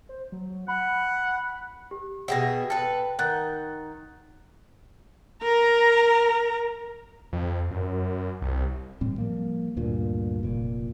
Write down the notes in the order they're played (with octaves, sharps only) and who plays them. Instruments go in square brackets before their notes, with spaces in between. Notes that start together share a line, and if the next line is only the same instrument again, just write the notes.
[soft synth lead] C5
F#3
[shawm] F#5 [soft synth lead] B5
[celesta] G4
[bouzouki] B2 G#4 E5 [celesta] F#5 G5 A#6
[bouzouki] A4 B4 [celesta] G5
[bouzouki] D#3 [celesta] F#5 F#6 A6
[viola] A#4 A#5
[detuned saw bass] F2
F#2
C2
[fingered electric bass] A1 A2 G3 C4
F3 G3 A#3
D2 G2 A#2
F1 A#2